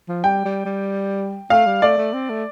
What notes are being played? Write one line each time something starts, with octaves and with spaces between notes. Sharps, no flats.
F3
G3 G5
G3
G3
A3 F5
G3
A3 D5
A3
C4
A3